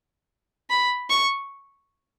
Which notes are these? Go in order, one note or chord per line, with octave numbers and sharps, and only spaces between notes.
B5
C#6